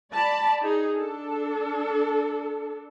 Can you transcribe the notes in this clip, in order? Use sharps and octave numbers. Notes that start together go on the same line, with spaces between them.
D5 A5 B5
D#4 G#4
D4 A4